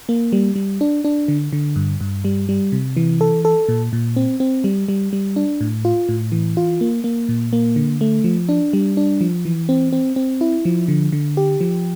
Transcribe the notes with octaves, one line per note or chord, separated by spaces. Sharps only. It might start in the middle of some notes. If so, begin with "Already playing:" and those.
A#3
G3
G3
D4
D4
D3
D3
G2
G2
G3
G3
C3
E3
A4
A4
A#2
A#2
C4
C4
G3
G3
G3
D4
A2
F4
A2
E3
F4
A#3
A#3
A#2
A#3
D3
A3
F3
D4
G3
D4
F3
E3
C4
C4
C4
E4
F3
D3
D3
G4
F3